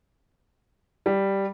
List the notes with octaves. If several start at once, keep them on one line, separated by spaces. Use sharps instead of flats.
G3